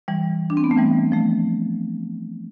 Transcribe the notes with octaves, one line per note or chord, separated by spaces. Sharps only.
E3 G3
D4
C4
B3
A3
E3 G3
F3 A3